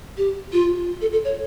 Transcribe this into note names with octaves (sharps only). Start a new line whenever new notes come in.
G4
F4
A4
A4
C#5